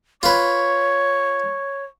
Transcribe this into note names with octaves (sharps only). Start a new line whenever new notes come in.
F4 B4 C#5 C#6